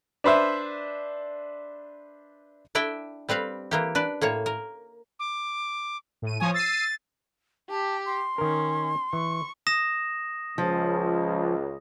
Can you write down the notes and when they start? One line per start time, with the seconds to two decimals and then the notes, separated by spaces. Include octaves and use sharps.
0.24 D4 B4 C5 E5
2.75 D4 E4 D5 E5 G5
3.29 G3 C4 B4 F5
3.71 E3 A#3 G4
3.95 D4 B4 D5
4.21 A2 A#3 C#5
4.46 A#4
5.20 D6
6.22 A2 D#7
6.40 F3 C#5 G#5 D#6
6.54 E6 A6 C7 D#7
7.70 G4 A5
8.06 C6
8.38 D#3 C#4 A#4
9.13 E3 C#6
9.67 D#6 A#6 E7
10.58 C#2 F3